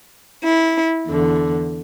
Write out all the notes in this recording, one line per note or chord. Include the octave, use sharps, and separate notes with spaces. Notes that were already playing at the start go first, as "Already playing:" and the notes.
E4
E2 D3